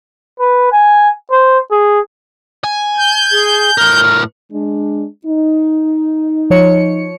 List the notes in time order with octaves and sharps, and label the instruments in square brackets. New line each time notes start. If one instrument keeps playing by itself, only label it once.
[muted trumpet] B4
G#5
C5
G#4
[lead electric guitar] G#5
[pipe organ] G6
[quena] G#4
[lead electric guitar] A2 A#4 [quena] F6
[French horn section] G#3 D4
D#4
[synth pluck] F3 C#5 C#7